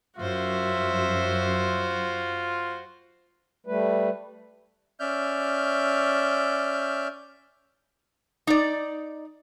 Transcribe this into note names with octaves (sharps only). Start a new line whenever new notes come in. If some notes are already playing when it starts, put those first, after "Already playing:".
F#2 F4 F#4 C5 E5
G3 A3 B4
C#4 D5 E5 F6 G6
D#4 D5